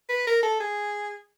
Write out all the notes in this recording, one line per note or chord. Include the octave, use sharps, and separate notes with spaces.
B4
A#4
A4
G#4